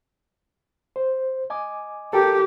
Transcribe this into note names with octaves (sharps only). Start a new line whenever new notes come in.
C5
D#5 G#5 D6
G4 A4 A#4 G5